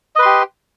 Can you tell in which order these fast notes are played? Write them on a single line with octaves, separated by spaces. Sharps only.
D#5 B4 C6 G4